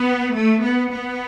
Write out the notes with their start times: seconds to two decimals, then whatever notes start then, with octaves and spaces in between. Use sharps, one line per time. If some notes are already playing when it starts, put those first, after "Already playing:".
Already playing: B3
0.33 A3
0.61 B3
0.91 B3